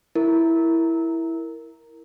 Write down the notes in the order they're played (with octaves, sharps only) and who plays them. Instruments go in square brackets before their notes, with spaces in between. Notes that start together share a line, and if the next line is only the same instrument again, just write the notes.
[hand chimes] E4 A#4